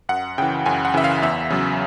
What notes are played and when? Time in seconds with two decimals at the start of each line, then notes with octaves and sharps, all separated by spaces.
0.09 F#2 F#5
0.38 C#3 E3 G5
0.66 F#2 G#5
0.85 F#5
0.94 C#3 E3 E5
1.04 F5
1.22 E2 E5
1.50 C#3 F#3